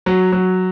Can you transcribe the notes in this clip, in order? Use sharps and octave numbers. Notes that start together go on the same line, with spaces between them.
F#3
F#3